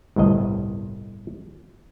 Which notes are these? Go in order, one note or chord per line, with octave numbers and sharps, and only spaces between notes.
G1 C2 A2 D#5